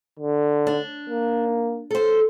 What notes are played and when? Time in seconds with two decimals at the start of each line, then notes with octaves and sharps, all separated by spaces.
0.19 D3
0.67 D4
1.10 A#3
1.91 A4 C5